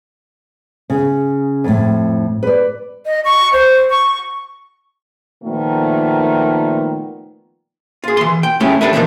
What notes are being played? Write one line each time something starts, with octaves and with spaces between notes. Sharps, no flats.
C#3
F2 A2
B4 D5
D#5
C#6
C5
C#6
A#2 D#3 F3 A3 B3
F4 G#4
E3 C6
G5
G#3 A3 C#4 E4 G4
G3 A#3 D4 A4 B4 E5
E3 F3 G3 D4 D#4 A#4